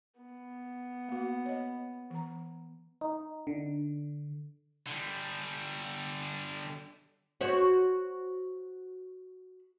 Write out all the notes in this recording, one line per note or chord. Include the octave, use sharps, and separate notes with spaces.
B3
A#3 F#4
C#5 D#5
E3 A#5
D#4
D3
D3 G3
F#4 C5 C#5